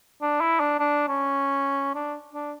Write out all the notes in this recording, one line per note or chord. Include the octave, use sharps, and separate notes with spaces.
D4
E4
D4
D4
C#4
D4
D4